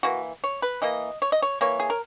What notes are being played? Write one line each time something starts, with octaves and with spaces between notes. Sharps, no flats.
E3 A#3 F#4
C#5
B4
E3 A#3 D#5
C#5
D#5
C#5
E3 A#3 C#5
G#4
A#4